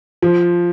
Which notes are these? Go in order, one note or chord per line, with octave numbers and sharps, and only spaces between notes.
F3